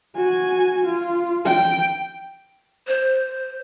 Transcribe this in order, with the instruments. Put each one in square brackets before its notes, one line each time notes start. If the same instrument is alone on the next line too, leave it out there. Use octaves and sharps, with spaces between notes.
[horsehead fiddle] F#4 G#5
F4
G5
[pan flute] C5